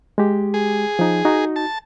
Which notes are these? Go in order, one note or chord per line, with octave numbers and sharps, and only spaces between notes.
G#3 G4
G#4
F3 D#4
D#4 F#4
A5